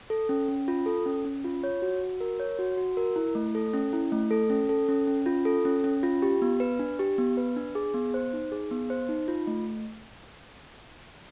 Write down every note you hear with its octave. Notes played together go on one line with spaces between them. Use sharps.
A4
C#4
C#4
F4
A4
C#4
C#4
F4
C#5
F#4
F#4
A#4
C#5
F#4
F#4
A#4
E4
A3
A4
C#4
E4
A3
A4
C#4
A4
C#4
C#4
F4
A4
C#4
C#4
F4
G4
B3
B4
D4
G4
B3
B4
D4
G#4
B3
C5
D#4
G#4
B3
C5
D#4
F4
A3